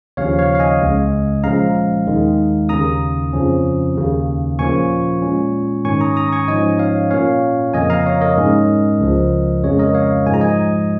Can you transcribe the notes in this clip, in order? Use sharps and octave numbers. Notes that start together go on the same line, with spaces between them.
D#2 C#3 F3 C#4 C#5 F5
C#5 F5
F5
D#5 G#5
C#2 C#3 G#3
A#2 F3 G#3 C#4 F5 A#5
D#2 D#3 G#3
D#2 C#3 A#3 C#4 A#5 D#6
F2 C#3 F3 C#4
D#2 C#3 A#3
A#2 F3 A#3 C#4 G#5 C#6
A#2 G#3 C#4
G#2 D#3 C#4 G#5 C#6
A#5 D#6
A#5 D#6
G#5 C#6
G#2 F3 C#4 D#5 G#5
C#5 F5
A#2 A#3 C#4 C#5 F5
F2 C#3 F3 A#3 D#5 G#5
F5 A#5
C#5
A#4 D#5
G#2 G#3 C#4
C#2 C#3 F3
F2 C#3 G#3 C#4 C#5
A#4 D#5
C#5 F5
G#2 F3 G#3 G#5
A#5
D#5 G#5